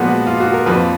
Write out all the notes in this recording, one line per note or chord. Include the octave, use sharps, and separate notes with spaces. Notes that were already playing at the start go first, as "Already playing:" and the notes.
Already playing: A#2 F3 G#3 B3 F#4
F4
F#4
A#4
F2 F3 A#3 B4